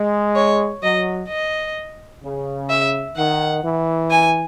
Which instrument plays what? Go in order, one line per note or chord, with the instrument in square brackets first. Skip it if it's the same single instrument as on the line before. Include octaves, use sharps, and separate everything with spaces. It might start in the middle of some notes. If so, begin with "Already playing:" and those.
Already playing: [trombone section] G#3
[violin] C#5
[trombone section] F#3 [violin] D#5
[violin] D#5
[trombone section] C#3
[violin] E5
[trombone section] D#3 [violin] F#5
[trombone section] E3
[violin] G#5